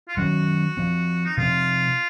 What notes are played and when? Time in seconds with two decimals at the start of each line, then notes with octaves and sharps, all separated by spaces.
0.08 F4
0.17 D#3 F#3 C#4 F#4
0.77 F3 C4
1.25 D#4
1.37 C3 F3 C4 F4